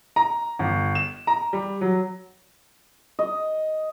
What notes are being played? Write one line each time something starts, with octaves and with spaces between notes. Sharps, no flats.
A#5
G1
E7
A#5
G3
F#3
D#5